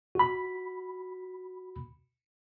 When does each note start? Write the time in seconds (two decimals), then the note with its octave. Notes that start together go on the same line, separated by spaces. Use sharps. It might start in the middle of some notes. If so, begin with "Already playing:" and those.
0.15 F#4 B5